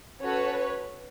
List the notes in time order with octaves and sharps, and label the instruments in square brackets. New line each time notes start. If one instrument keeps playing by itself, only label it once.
[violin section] C#4 F#4 A4 B4 C#5